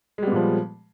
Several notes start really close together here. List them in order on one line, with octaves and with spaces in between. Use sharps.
G#3 G3 B3 A#2 F3